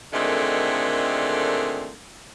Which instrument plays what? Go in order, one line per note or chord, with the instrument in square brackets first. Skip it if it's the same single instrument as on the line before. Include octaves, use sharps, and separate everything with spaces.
[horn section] A#2 D3 D#3 G#3 A3 C4